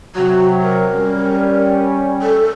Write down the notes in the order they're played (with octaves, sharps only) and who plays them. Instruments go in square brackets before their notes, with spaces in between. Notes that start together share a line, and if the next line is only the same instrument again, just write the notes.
[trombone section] C3 F#3 [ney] F#4
[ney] A#4
[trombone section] G3 C#4
[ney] A4